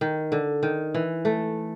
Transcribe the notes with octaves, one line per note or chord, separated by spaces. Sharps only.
D#3
D3
D#3
E3
A3